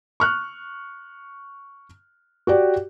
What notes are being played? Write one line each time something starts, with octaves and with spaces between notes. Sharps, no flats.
C#6 F6 F#6
F#4 G4 D5